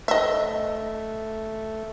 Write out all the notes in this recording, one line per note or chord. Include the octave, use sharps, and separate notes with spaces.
A3 D#5 E5